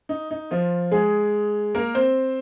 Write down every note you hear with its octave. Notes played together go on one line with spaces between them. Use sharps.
D#4
D#4
F3 F4
G#3 G#4
A#3 A#4
C4 C5